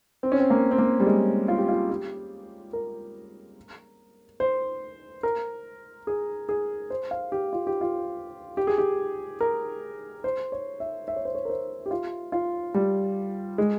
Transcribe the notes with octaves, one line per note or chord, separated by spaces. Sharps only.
C4
C#4
C4
A#3
C4
A#3
G3
G#3
F4
G4
F4
G4
A#4
C5
A#4
G#4
G#4
C5
F5
G4
F4
G4
F4
G4
G#4
G4
A#4
C5
C#5
E5
E5
C#5
C5
C#5
A#4
C5
G4
F4
F4
G3
G#3